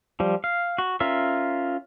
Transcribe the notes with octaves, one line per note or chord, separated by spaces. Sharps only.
F3 G3
F5
F#4
C#4 F4 A#4 E5